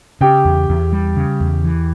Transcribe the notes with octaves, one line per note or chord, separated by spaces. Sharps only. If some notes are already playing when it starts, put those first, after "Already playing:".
C#3 G4 G5
E2
E2
G3
C#3
E2
E3